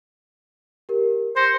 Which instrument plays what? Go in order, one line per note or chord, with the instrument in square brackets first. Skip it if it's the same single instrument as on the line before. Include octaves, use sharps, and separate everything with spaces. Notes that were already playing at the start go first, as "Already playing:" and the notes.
[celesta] G4 A#4
[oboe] C5 [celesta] C6 A#6 C#7